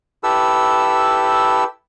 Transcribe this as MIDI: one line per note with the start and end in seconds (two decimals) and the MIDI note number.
0.23 1.64 64
0.23 1.64 67
0.23 1.64 69
0.23 1.64 71
0.23 1.64 88